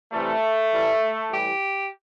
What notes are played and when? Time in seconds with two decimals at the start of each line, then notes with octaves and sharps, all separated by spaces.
0.12 C3 E3 G3 A3
0.72 A2 E3 G3
1.31 A2 E3 G3 G4